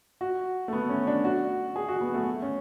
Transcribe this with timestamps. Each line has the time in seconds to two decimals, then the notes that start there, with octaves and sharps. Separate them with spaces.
0.21 F#4
0.68 A3
0.73 B3
0.89 C#4
1.07 D4
1.24 F#4
1.76 G#4
1.88 F#4
2.01 B3
2.14 A3
2.42 C#4